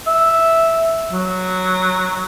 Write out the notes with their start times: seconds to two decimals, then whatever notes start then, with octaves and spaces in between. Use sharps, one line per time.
0.07 E5
1.12 F#3